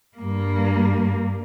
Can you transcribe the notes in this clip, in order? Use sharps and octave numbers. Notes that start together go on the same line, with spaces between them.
G2 A#3